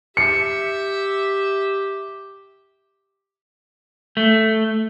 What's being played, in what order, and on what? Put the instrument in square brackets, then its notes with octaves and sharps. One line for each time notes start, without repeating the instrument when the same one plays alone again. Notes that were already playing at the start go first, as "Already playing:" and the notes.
[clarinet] G4 [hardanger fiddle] E5 [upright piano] C#7
[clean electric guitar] A3